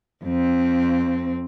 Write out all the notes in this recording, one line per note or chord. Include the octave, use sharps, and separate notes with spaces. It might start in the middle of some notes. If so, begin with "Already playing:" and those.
F2 C4